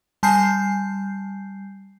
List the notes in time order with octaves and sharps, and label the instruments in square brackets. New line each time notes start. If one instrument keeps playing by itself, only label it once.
[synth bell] G3 G#5 A5 G6 C7